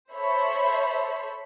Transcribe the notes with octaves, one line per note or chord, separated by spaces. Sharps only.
A4 C5 C#5 E5 B5